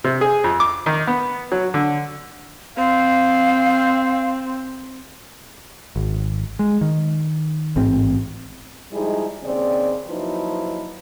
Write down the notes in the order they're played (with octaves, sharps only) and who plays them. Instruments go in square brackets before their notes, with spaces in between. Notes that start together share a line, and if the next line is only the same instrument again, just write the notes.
[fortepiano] C3
G#4
F2
D6
D#3
B3
F#3
D3
[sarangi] C4 [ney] F5
[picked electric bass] G#1
G#3
D#3
A1 G#2 C4
[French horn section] F3 G3 G#3 D#4 E4 G#4
D#2 C#3 C4 D5
D#2 F3 F#3 D#4 E4 B4